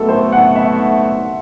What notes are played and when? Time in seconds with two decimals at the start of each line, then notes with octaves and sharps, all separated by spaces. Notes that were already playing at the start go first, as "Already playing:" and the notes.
Already playing: B1 B2 A3 A4
0.09 C5
0.32 F#5
0.55 E5